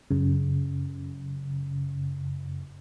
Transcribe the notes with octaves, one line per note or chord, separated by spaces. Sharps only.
F#2 C#3